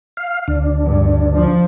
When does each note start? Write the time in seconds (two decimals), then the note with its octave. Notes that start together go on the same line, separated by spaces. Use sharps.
0.17 F5
0.48 D2 D4
0.86 G2
1.35 F3